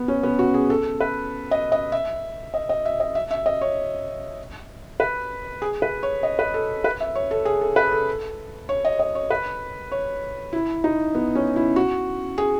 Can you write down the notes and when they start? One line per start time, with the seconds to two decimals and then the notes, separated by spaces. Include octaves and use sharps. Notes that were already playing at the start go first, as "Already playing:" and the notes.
Already playing: B3
0.08 C#4
0.23 B3
0.39 F#4
0.54 G#4
0.70 A4
1.00 B4
1.51 D#5
1.72 D#5
1.92 E5
2.54 D#5
2.69 D#5
2.85 E5
3.00 D#5
3.15 E5
3.31 E5
3.46 D#5
3.61 C#5
5.00 B4
5.62 G#4
5.82 B4
6.03 C#5
6.23 D#5
6.39 B4
6.54 A4
6.84 B4
7.00 E5
7.15 C#5
7.31 A4
7.45 G#4
7.61 A4
7.76 B4
7.92 A4
8.69 C#5
8.85 D#5
9.00 D#5
9.15 C#5
9.30 B4
9.92 C#5
10.53 E4
10.84 D#4
11.15 B3
11.35 C#4
11.56 E4
11.76 F#4
12.38 G#4